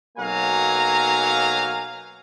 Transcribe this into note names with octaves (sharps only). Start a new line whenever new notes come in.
B1 F#3 A#3 F5 G#5 A#5